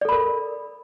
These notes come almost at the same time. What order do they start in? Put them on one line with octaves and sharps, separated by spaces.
D5 A4 B5 A#4